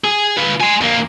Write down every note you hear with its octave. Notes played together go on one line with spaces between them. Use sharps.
G#4
F4 B4
G#5 C6
F2 A#3